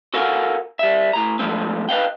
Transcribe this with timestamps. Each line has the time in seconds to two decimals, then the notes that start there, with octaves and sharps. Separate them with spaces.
0.14 F#4 A4 A#4 F5 F#5 G#5
0.79 G3 E5
1.13 A2 A#5
1.39 F3 G#3 A3 C4
1.89 B4 D#5 F5 G5